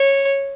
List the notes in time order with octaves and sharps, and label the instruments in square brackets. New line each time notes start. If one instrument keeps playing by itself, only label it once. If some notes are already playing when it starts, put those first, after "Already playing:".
Already playing: [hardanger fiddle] C#5